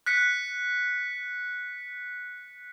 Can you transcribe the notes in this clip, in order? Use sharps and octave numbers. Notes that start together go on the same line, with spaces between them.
F#6 B6 C#7